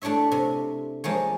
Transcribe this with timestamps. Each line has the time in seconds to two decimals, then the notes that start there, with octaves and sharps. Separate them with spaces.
0.02 A3 D4 E4 C#5 E5
0.32 C3
1.04 F3 G#3 A#3 C#5